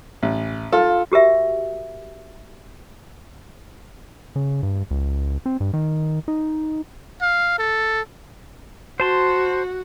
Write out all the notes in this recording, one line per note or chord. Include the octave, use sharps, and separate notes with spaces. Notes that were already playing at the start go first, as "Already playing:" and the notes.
A1
F4 A4
F#4 G4 A#4 E5
C#3
G2
C#2
C4
G2
D#3
D#4
F5
A4
F#4 C5 A5 C6